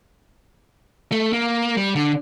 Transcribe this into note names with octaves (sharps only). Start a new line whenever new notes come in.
A3
A#3
G3
D3